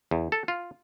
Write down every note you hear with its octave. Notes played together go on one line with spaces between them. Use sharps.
E2
A4
F4